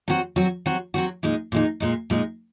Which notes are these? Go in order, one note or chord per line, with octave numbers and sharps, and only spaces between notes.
F#3 C4 F#4
F#3 C4 F#4
F#3 C4 F#4
F#3 C4 F#4
A#2 G#3 D#4
A#2 G#3 D#4
A#2 G#3 D#4
A#2 G#3 D#4